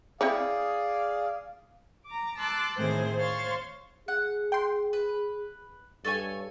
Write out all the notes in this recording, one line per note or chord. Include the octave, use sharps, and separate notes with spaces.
C4 E4 G#4 C#5 D5 F5
A#5 D6
A5 C6 D6 E6 F#6
A2 D#3 A3 C4 G#4 C5
C5 C#5 F5 C6 C#6 A6
G#4 F#5
G5 C6
B4
G2 A4 C#5 G#5